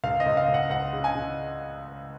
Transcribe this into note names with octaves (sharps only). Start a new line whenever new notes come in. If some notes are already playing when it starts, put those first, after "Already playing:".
C#2 F5
D#5
C#2
F5
C#2
F#5
C#2 F#5
C#3
G#5
C#3